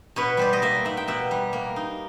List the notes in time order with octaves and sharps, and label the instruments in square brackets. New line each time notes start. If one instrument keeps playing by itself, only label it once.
[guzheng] B2 B4 C#5
G3 C5 D5
D#5
A#3 D5 E5
D#4 E5 F#5
G5
B2 E5 F#5
G3
A#3
D#4